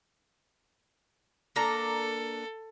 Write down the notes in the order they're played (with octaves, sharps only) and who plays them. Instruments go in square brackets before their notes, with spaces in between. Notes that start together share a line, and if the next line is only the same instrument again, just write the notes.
[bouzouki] A#3 D4 A#5 [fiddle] A4